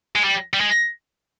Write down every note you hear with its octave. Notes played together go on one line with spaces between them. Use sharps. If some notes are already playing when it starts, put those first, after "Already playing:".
G#3
G3
G3
G#3